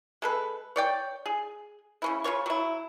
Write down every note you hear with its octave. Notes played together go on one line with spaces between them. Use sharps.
G#3 A4 B4
C#5 D5 G5
G#4
C#3 C#4 E4
C#3 F4 C#5 C#6
F#3 E4